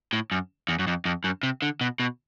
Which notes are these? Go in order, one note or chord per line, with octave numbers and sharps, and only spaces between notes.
A2
F#2
E2
F#2
F2
F2
F#2
C3
D3
B2
B2